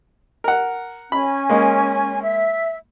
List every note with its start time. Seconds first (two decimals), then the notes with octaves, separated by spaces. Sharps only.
0.44 A#4 F#5
1.12 C#4 G#5 B5
1.50 G#3 A#3
2.22 E5